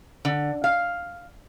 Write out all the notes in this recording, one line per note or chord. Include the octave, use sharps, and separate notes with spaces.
D3
F5